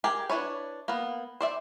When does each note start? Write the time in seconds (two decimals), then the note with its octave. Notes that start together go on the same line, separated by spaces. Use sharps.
0.04 G4 G#4 A#4 G#5
0.29 D4 E4 B4 C#5
0.88 A#3 B3
1.41 C5 D5 E5